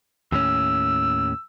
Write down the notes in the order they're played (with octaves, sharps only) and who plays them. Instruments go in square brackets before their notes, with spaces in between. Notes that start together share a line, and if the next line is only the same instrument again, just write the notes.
[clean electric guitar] D#2 A2 C#4 [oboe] E6